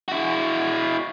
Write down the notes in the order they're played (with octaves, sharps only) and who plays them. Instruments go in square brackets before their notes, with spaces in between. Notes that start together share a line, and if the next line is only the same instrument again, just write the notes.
[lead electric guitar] E4 F#4